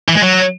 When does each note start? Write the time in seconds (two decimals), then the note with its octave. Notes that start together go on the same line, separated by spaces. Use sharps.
0.09 E3
0.15 G#3
0.22 F#3